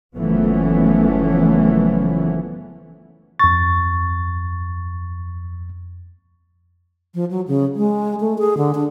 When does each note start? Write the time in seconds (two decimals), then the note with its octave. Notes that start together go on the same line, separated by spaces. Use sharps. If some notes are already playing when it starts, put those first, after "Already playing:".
0.16 F#1 E3 F3 A3 B3 C#4
3.39 F2 C#6 A6
7.15 F3
7.31 F#3
7.48 C#3
7.75 G#3
8.20 A3
8.39 G#4
8.57 D3
8.74 D4